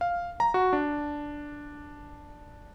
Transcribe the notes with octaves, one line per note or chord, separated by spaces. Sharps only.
F5
A#5
F#4
D4